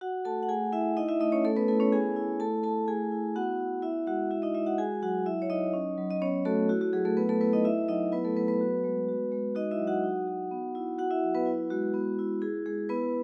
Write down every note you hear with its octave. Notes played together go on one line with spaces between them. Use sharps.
F#4 F#5
A3 A4 A5
F#5
A3 G#4 G#5
E4 E5
D#4 E4 D#5
E4 E5
A3 D#4 D#5
C#4 C#5
A3 C#4 A4
B3 B4
A3 E4 A4
C#4 C#5
B3 G#4 G#5
E4
A3 A4 A5
E4 A4 A5
A3 G#4 G#5
E4
B3 F#4 F#5
E4
E4 E5
G#3 F#4 F#5
E4 F#4 E5
D#4 D#5
G#3 E4 E5
F#4 F#5
F#4 G#4 G#5
F#3 F#4 F#5
E4 E5
C#5
F#3 D#4 D#5
C#4
F#3
D#5
B3 C#4 C#5
A3 F#4 A4
E4 F#4
F#4
F#3 G#4
A3 A4
B3 B4
A3 A4
B3 E4 B4
D#4 D#5
E4 E5
F#3 D#4 D#5
B3 E4 B4
A3 A4
F#3 B3 B4
B3 B4
F#4
G#3
F#4
G#3
D#4 F#4 D#5
E4 E5
F#3
F#4 F#5
D#4
F#4
B3
E4
F#4 F#5
E4 E5
F#3
B3 B4
E4
G#3 F#4
B3
E4
E4 G#4
G#3 G#4
B3 E4 B4